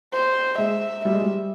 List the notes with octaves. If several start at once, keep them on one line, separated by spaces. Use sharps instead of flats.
C5
G#3 E5
G3 E5
G#3
G3